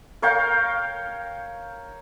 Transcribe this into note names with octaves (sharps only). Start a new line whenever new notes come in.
A#4 C#5 F5 G5